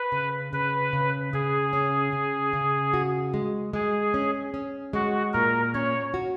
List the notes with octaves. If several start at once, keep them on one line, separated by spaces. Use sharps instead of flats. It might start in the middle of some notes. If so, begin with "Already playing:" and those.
Already playing: B4
C#3
C#3 B4
C#3
C#3 G#4
C#4
C#3
C#3
F#4
G#3
G#3 G#4
C#4
C#4
G#3 F#4
A#2 A#4
C#4 C#5
F#4